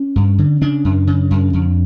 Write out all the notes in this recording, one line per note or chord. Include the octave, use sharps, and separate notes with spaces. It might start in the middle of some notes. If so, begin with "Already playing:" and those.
Already playing: C#4
G2
D3
C#3 D4
F#2
C#3
F#2
F2